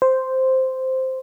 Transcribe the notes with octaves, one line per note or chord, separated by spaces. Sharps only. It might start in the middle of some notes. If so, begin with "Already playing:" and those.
C5